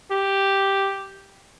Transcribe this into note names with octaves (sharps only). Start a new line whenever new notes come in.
G4